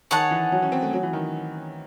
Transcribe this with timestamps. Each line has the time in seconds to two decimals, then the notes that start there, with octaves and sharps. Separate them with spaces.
0.11 D#3 G#4 C#5 F#5 A5
0.31 E3
0.52 F#3
0.62 C#4
0.72 C4
0.83 A3
0.93 F#3
1.03 E3
1.13 D#3